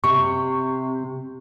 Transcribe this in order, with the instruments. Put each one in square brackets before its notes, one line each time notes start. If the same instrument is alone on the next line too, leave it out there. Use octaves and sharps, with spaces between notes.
[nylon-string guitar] C3 [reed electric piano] C#6